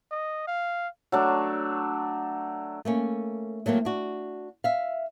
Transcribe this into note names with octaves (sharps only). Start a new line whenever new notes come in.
D#5
F5
F#3 A3 D4
A3 A#3 C#4
F#3 A3 A#3 C4
D4 F#4
E5 F5